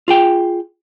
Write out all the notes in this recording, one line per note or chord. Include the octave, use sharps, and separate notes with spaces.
F4 G#4 G5